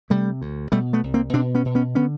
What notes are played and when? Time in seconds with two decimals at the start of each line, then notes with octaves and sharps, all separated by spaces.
0.10 C3 G3 A3
0.42 D2
0.72 B2 G3 A3
0.93 A3 B3
1.03 C2
1.14 A#3 C4
1.33 B2 C4 D4
1.55 B3 C#4
1.65 B2
1.75 B3 C#4
1.95 D3 B3 C#4